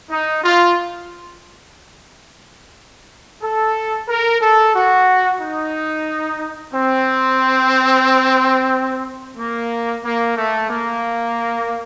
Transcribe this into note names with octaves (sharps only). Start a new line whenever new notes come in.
D#4
F4
A4
A#4
A4
F#4
D#4
C4
A#3
A#3
A3
A#3